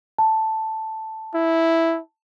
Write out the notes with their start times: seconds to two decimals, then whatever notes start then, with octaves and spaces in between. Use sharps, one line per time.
0.18 A5
1.35 E4